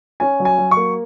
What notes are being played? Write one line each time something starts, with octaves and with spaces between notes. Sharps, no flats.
C#4 G#5
F#3
G#5
F#3
C#6
A#3